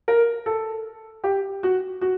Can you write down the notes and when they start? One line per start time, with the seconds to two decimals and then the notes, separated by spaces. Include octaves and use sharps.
0.08 A#4
0.46 A4
1.24 G4
1.63 F#4
2.01 F#4